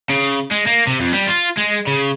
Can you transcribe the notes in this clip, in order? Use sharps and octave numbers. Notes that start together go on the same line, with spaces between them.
C#3
G#3
A#3
C3
F2
G3
F4
G#3
C#3